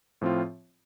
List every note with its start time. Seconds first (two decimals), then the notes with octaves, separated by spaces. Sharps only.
0.21 A2 F3 C4 F4